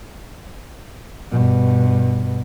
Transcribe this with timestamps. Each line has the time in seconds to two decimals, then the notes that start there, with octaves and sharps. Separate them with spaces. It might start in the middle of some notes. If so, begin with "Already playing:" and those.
1.31 G2 B2